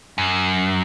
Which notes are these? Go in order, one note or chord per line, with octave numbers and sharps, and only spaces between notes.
F#2